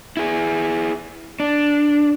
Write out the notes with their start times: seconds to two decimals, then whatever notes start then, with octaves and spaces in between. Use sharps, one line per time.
0.17 E4 G#4
1.40 D4